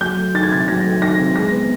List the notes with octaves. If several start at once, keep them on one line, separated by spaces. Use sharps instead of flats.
F#3 G6
A3
D#3 A6
G#6
C3 A6
F#3 A#6
A3
D#3 A#6
C3
G#3 A#6
B3